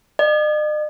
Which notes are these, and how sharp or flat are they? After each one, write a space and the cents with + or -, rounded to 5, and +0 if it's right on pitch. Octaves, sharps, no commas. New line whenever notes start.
D#5 -45